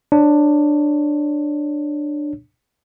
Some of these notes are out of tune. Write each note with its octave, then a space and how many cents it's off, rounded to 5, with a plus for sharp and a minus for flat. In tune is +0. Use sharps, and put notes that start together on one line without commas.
D4 +15 C#5 +0